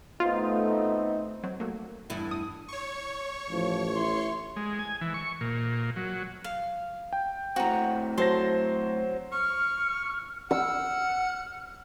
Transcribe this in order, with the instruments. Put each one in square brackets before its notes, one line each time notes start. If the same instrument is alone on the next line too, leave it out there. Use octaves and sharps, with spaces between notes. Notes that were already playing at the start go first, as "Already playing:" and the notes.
[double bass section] A3 [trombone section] B3 C4 D#4 [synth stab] F4
[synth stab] F#3 C4
F#3 A3 A#3
[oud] E2 G2 E4
[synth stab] A1 D#6
[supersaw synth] C#5 C#6
[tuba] A1 [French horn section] F3
[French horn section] E4 [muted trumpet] C6
[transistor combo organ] G#3
G#5
E3
C#6
A#2
F#3
[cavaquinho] F5
[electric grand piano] G5
[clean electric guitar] A2 C4 [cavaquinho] F#4 A#5
[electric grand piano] F#3 C5 A#6 [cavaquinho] A4 A5 C6
[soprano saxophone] C#6 [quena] F6
[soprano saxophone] F#5 [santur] E6 [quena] F6